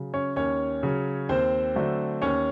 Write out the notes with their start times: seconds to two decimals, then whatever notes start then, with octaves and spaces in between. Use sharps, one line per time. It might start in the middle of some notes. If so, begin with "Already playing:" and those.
Already playing: C#3 F#3
0.14 C#4 C#5
0.36 D#2 C#4 C#5
0.83 C#3 F#3
1.29 D#2 C4 C5
1.76 D3 F#3 A3
2.22 D#2 C#4 C#5